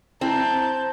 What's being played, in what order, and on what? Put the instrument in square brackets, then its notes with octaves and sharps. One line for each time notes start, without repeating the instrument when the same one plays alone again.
[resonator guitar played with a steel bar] C4 [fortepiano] E4 [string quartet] A5 G6 [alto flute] A#5